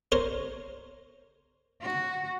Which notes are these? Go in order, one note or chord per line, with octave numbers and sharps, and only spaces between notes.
A#4 C5 C#5
F#4